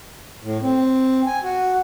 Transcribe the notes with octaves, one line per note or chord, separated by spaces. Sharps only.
A2
C4
G#5
F#4